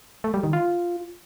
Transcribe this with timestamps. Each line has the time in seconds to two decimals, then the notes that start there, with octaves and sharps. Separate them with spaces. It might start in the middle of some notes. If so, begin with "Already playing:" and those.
0.24 A3
0.34 G3
0.43 D#3
0.53 F4